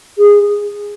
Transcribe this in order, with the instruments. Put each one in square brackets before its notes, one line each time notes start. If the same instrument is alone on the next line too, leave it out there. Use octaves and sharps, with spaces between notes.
[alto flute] G#4